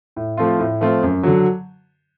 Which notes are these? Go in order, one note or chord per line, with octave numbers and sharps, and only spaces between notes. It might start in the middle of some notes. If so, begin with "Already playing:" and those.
A2
F3 A3 C4 F4
A2
F3 A3 C4 F4
F#2
D3 F#3